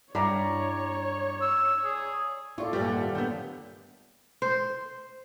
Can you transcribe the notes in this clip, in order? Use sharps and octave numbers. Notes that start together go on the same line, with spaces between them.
G2 E4 C#5 D5 F5 A#5 C#6
E6
G#4
A#2 F4 A4 D5 E5 C#6
G2 A#2 G3 G4
D#2 A4 F#5
G2 C3 D#3 G4
A#2 D3 F#3 A#3 B3 G6
C5